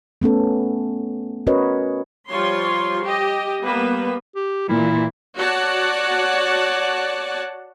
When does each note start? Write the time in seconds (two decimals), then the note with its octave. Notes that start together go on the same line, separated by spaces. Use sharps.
0.22 A3 B3 C#4 A4
1.47 C#4 F#4 A#4 B4 C#5 D#5
2.29 F3 G3 F4 C#5 C6
3.03 G4 D#5
3.61 G3 A#3 B3 B4
4.36 G4
4.69 A#2 E3 E4
5.37 F#4 C#5 D5 F#5 A5